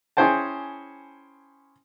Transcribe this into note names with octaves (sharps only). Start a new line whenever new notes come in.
C#4 E4 G#4 C5 G5 A5